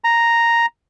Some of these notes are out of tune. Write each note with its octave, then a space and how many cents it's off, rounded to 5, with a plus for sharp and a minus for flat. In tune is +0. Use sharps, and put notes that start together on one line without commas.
A#5 +0